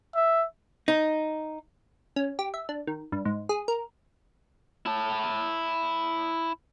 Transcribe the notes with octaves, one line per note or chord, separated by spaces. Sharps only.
E5
D#4
C#4
G4
E5
D4
D#3
G2
G#2
G#4
A#4
E4 A5